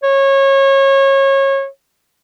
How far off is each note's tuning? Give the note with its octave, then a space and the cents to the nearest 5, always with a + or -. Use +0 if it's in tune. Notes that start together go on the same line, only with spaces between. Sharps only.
C#5 -25